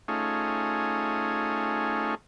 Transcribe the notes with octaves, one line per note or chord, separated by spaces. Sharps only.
A3 C#4 D#4 F4 G#4